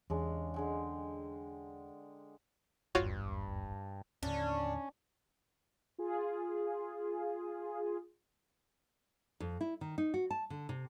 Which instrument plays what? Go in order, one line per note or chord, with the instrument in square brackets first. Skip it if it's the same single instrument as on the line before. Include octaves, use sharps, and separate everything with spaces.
[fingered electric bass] E2 [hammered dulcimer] C#3 G#3 D4
[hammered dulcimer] D3 G#3 G5
[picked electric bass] D#1 G#1 E2 [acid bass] G2 [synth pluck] F4 F#4 C#5
[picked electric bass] D#2 A2 D3 [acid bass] C#4 [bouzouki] D4
[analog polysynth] F4 G#4
[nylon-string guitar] F2
E4
D#3
D#4
F#4
A5
D3
C3